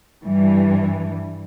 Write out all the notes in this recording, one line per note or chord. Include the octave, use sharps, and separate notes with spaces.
G2 E3 G3